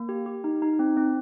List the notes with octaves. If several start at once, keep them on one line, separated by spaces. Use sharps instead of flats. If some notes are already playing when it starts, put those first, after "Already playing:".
Already playing: A#3
G4
G4
D#4
D#4
C4
C4